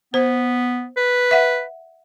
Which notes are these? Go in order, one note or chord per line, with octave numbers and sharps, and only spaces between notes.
B3 C5
B4
E5 F#5